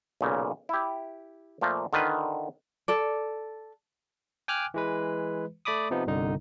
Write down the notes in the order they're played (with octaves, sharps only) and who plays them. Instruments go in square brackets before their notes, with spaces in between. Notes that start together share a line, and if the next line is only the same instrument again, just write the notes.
[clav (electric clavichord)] B1 A#2 C#3
E4 G4
A#2 F3 A3 A#3
D3 D#3 F4 B4
[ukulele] A4 D5
[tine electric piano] G5 G#5 D6 F6 F#6
E3 G#3 B4
A3 D5 B5 D6 D#6
C3 F3 B3 D#4
G1 C2 D3 D#4